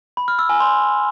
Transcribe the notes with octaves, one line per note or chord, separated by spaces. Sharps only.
B5
F6
E6
G#5
C6